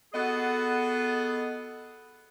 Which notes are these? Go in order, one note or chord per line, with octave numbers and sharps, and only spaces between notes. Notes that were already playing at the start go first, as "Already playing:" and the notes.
B3 F#4 G#4 A4 D#5